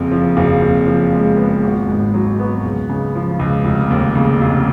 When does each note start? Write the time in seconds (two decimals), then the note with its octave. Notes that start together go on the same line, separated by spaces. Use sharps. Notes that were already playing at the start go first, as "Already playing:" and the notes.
Already playing: F#1 F2
0.11 F3
0.37 F#1
0.62 F2
0.87 F3
1.13 G#3
1.38 B3
1.62 G#1
1.88 G#2
2.14 F#3
2.39 B3
2.64 C#2
2.89 C#3
3.15 F3
3.39 C#2
3.65 F1
3.90 D#2
4.15 C#3
4.41 F1